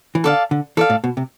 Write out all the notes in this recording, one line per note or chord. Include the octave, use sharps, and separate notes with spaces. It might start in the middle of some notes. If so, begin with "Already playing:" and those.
E3
D3 A4 D5 F5
D3
E3 A4 D5 F5
A2
B2
C3